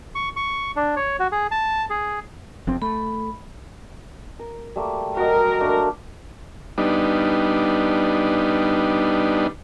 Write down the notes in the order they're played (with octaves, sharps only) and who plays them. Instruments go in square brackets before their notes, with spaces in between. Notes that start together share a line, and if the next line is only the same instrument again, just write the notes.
[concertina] C#6
C#6
D4
C#5
F#4
G#4
A5
G#4
[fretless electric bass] F1 F2 C4
[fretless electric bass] A3 [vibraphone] B5
[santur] A#4
G3 A3 A#3
[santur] F#4 D#5 [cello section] A#4
[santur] A3 A#3 D4
[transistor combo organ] G3 B3 D4 D#4